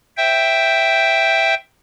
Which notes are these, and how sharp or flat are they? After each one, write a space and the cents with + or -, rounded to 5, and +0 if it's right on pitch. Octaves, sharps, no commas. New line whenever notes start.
C5 +0 E5 +5 G5 +0